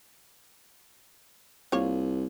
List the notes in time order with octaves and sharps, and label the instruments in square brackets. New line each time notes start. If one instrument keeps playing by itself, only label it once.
[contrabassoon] C2 [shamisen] A#3 F4 C#5